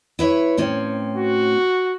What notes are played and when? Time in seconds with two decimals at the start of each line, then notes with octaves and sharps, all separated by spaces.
0.19 E4 B4 C#5
0.58 A2 C4 C#4
1.16 F#4